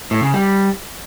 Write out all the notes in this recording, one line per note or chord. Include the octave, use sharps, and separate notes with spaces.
A2
C#3
G3